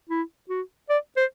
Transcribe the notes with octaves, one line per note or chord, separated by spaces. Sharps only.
E4
F#4
D5
C5